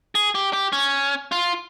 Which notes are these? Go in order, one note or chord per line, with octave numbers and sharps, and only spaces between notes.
G#4
G4
G4
C#4
F4